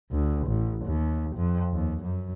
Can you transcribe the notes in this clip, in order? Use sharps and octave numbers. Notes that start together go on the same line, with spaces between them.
D2
A1
D#2
F2
D#2
F#2